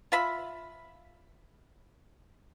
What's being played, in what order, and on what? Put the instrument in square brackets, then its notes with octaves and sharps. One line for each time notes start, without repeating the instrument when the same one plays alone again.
[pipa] F4 E5 B5